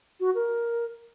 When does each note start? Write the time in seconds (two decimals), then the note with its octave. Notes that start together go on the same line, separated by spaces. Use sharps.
0.20 F#4
0.35 A#4